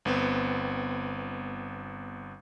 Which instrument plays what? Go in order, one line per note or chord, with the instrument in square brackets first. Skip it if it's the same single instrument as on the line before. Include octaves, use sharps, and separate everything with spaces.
[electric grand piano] G1 B3 C4